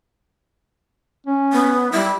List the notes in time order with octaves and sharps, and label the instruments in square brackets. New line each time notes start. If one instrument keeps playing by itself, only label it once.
[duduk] C#4
[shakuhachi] B3
[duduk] G3 [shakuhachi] E4